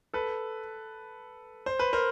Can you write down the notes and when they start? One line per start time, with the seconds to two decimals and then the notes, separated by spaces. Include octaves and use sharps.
0.14 A4 B4
1.66 C5
1.79 B4
1.93 A#4 C5